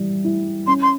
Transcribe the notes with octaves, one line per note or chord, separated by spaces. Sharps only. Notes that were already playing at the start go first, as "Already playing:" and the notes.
Already playing: E3 G3
E4
C#4 C6
C6